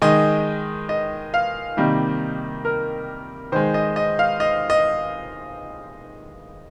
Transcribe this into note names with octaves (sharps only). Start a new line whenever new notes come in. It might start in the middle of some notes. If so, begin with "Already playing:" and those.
D#3 G#3 D#5
D#5
F5
C3 D#3 G3 A#3
A#4
D#3 G#3 C5
D#5
D#5
F5
D#5
D#5